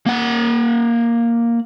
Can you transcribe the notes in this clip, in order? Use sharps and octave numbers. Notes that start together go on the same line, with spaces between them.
A#3 F#5